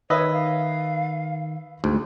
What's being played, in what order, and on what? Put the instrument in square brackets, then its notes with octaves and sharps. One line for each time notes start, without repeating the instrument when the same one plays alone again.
[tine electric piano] D#3 [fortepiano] B4 D#5 E5 [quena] C#5
[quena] F5
[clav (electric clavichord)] D2 G#2 [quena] A4